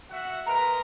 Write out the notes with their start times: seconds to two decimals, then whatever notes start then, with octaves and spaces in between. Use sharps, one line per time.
0.11 F#4 E5 F#5
0.46 G#3 A#4 B4 A#5